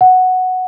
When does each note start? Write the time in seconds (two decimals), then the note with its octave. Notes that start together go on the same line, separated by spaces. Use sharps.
0.01 F#5